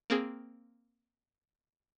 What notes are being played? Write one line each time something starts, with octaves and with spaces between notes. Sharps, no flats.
A#3 C4 G#4